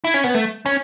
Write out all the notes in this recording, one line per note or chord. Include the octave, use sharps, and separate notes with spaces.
E4
C#4
B3
A3
C#4